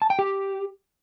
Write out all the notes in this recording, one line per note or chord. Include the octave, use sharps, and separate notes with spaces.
A5
G5
G4